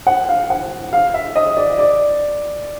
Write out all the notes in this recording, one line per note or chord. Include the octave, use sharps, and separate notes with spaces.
F#5
F5
F#5
F5
E5
D#5
D5
D5